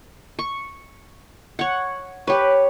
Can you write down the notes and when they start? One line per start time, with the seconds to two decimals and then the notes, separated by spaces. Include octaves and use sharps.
0.39 C#6
1.59 C#5 F#5
2.27 G4 B4 C#5